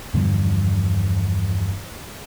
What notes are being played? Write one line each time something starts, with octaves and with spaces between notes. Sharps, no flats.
E2 G2 D3 F3